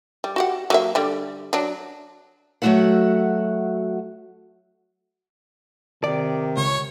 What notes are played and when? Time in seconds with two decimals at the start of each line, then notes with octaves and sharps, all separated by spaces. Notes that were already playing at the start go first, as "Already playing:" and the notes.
0.24 G3
0.36 F#4 G4 F#5
0.70 F#3 A#3 E5
0.95 D3 G3
1.53 F#3 D4
2.62 F#3 A3 C4 F#4 E5 F#5
6.04 C3 D#3 D5
6.57 C#2 C#5